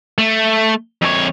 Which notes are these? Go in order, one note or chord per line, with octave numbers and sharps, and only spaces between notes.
A3
F2 C#5